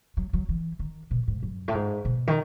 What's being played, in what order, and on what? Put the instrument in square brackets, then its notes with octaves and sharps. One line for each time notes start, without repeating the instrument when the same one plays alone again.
[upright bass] F#3
F#3
E3
D#3
B2
G#2
F#2
A2
G#2
B2
D#3